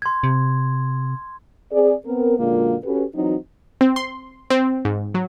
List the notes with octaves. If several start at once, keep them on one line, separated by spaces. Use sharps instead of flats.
C6 G#6
C3
C4 G#4 D5
B3 C4 A#4
F#2 A#2 D3 G#3 A#3 F4
C#4 F#4 G4 A4 B4
E3 F#3 C4 D#4 F#4
C4
C6
C4
G#2
F#3